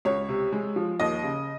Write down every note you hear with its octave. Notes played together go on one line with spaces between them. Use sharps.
C#2 C#5
C3
G#3
F3
D#2 D#5
C#3